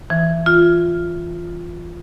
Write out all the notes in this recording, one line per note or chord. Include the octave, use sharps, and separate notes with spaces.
E3
F4